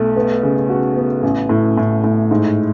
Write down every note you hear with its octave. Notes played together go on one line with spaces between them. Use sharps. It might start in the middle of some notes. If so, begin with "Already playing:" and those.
Already playing: B1 A3
B3
C#3
F#4
B3
A1
A2
A2
A2
G#2